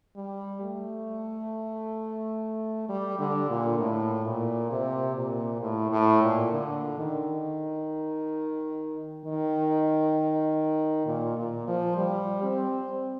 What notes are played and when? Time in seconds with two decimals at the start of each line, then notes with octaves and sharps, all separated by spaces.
0.16 G3
0.62 A3
2.89 G3
3.19 D3
3.50 A#2
3.79 A2
4.26 A#2
4.71 C3
5.16 A#2
5.61 A2
5.91 A2
6.22 A#2
6.52 D3
6.98 D#3
9.25 D#3
11.06 A#2
11.37 A#2
11.68 F3
11.97 G3
12.43 C4